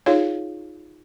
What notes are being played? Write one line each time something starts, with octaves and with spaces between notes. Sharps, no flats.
D#4 F4 G#4 C#5 F5